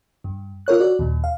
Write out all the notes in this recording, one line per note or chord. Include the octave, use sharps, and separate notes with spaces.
G2
F4 A#4 C#5 F#6
F#4 D5
D#2 A#2
F5